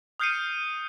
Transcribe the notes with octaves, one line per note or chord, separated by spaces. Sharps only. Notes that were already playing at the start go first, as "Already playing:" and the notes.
D#6 F6 G6 C7 C#7 D#7